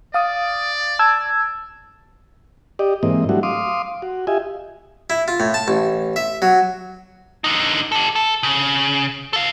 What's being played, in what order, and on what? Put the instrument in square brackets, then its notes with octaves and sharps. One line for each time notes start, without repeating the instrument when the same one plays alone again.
[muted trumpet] D5 [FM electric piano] F5 D#6
[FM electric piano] A5 E6 G#6
[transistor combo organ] G4 D5 D#5
G#2 E3 A#3 C4 D#5
F#3 G3 A3 D4 E4 F#4
F5 C6 D6 D#6
F#4
F4 G4 D#5 E5 G#5
[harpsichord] E4
F4
A2
A5
A1
E5
F#3
[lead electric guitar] D3 D#4
G4 A4
A4
C#3
A4 F5